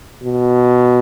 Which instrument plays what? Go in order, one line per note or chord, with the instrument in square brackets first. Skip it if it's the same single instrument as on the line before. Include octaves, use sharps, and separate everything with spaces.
[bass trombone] B2